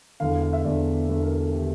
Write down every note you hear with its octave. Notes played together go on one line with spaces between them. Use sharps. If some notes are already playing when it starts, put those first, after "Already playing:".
E1 E2 D3 F5
F5
F5
E5
E1 E2 D3 D5
E1 E2 D3
A#4
A4
D3 G4